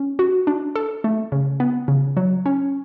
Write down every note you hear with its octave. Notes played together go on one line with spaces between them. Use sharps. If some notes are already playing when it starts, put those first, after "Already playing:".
Already playing: C#4
F#4
D4
A4
A3
C#3
B3
C#3
F#3
C#4